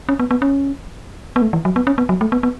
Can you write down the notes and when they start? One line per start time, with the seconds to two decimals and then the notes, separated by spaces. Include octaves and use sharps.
0.09 C#4
0.19 B3
0.31 B3
0.42 C#4
1.36 B3
1.42 A3
1.53 E3
1.65 F#3
1.76 B3
1.87 C#4
1.98 B3
2.09 F#3
2.21 A3
2.32 B3
2.43 B3